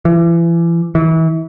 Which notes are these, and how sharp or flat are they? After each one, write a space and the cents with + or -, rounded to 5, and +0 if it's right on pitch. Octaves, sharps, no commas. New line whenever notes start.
E3 +35
E3 -30